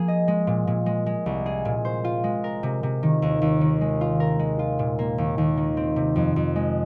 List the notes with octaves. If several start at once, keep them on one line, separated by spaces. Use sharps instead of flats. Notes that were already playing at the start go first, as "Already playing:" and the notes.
Already playing: F3 A#3 G#4
D#5
G#3
A#2
A#2
G#3
G#3
C2
G#4
A#2
C5
F4
G#3
A#4
C3
C3
D#3
D#2
D#2
D#3
G#3
F4
A#4
G#3
F4
A#2
A#3
D#2
D#2
D#3
C4
C3
F2
F2
G#3